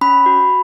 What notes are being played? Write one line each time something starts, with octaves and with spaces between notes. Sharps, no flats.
C#4 B5
F#4